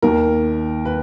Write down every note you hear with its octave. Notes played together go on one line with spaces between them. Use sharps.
D#2 D#3 A#4
B4